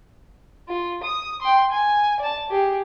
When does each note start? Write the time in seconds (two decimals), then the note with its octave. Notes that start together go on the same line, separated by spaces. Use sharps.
0.68 F4
1.03 D#6
1.42 G5 C6
1.72 G#5
2.20 D5 A5
2.49 G4 G#4